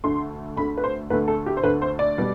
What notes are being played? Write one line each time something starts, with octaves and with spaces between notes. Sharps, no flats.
D2 D3 A3 C6
D2 D3 A3 B5
B4
C5
D2 D3 A3 B4
A4
G4
C5
D2 D3 A3 B4
C5
D5
B2 G3 B3